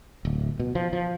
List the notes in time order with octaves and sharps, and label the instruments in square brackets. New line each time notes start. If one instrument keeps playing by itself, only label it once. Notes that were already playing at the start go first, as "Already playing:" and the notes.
[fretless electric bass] D1
B2
F3
F3